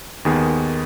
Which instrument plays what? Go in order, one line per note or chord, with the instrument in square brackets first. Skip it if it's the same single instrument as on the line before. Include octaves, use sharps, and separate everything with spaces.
[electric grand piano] D#2 D#3 B3 G#4